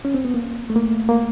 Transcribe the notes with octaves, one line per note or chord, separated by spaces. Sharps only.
C#4
C4
B3
A#3
A3
A#3
A#3